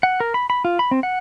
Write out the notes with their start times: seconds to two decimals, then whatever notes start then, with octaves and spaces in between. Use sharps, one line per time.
0.03 F#5
0.20 A#4
0.34 B5
0.50 B5
0.65 F4
0.79 B5
0.91 C4
1.03 F#5